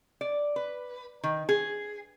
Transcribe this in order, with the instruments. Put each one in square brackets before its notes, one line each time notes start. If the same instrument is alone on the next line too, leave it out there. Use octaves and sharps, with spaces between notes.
[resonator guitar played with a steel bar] D5
B4
D#3
G#4